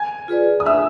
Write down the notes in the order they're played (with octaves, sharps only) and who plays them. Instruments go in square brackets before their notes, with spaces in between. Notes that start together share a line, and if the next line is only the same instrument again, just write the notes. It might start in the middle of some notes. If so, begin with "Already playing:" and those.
Already playing: [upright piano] G#5 G#6
[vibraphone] F4 G#4 B4 D5
[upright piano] D#6
[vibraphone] D4 [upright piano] E5 E6